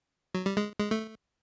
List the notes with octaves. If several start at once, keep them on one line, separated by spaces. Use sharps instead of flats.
F#3
G3
G#3
G#3
A3